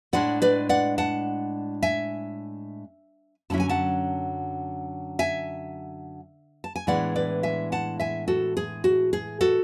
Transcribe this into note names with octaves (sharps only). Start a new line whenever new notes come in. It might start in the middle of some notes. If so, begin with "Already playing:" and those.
A2 G#3 D4 D5 F#5
B4 D5
D5 F#5
F#5 A5
E5 G#5
F#2 D3 F#3 C#4 E4 A5
G#5
F#5 A5
E5 G#5
A5
G#5
A2 E3 G#3 B3 D4 D5 F#5
B4 D5
E5 G#5
F#5 A5
E5 G#5
F#4 A4
G#4
F#4
G#4
F#4 A4